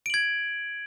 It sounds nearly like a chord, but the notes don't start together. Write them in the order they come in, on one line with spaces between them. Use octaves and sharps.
D7 F#7 G#6